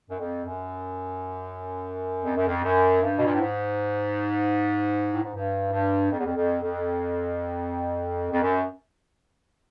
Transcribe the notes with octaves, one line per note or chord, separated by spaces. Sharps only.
F#2
F2
F#2
F2
F#2
F2
F#2
G2
B2
A#2
A2
G#2
A2
G#2
G2
G2
F2
E2
F2
F2
F2
F2
F#2